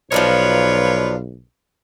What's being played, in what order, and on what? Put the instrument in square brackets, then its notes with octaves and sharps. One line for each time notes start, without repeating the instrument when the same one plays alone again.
[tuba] B1 [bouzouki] F3 D4 D#4 [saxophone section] F4 B4 C#5